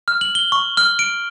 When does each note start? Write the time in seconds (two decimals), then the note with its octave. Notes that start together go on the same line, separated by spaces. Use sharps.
0.08 F6
0.21 F#7
0.35 G7
0.52 C#6
0.77 F6
0.99 D7